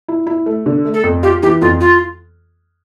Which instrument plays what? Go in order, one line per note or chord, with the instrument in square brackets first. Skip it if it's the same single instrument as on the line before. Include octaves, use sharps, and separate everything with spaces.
[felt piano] E4
E4
A3
D3
A3
[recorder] A4
[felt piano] F2
[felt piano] F4 [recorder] G4
[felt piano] E3 [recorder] G4
[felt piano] F2 [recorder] F4
[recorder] F4